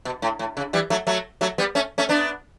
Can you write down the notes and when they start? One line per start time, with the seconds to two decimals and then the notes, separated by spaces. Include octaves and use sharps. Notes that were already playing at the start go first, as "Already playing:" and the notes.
0.05 B2
0.22 A2
0.39 A2
0.57 C#3
0.73 E3 G3
0.90 F#3 A3
1.07 F#3 A3
1.41 F#3 A3
1.58 G3 B3
1.75 A3 C#4
1.98 A3 C#4
2.09 B3 D4